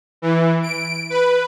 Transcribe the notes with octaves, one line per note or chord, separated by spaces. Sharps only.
E3
D7
B4